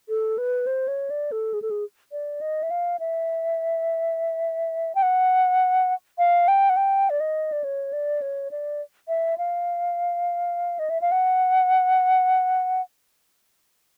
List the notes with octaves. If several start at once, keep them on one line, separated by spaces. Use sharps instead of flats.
A4
B4
C5
C#5
D5
A4
G#4
A4
G#4
D5
D#5
E5
F5
E5
G5
F#5
F5
G5
F#5
G5
D5
D#5
D5
C#5
D5
C#5
D5
E5
F5
D#5
E5
F5
F#5